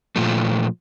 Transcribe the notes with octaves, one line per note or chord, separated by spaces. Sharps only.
A#2 F3 A3